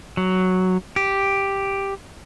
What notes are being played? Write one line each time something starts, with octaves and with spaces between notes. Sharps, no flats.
F#3
G4